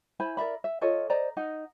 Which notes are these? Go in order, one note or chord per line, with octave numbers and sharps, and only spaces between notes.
E4 C5 G#5 B5
A#4 D5 E5 B5
E5
F4 A4 C#5 D#5
C5 D5 D#5 A#5
D#4 D#5 F#5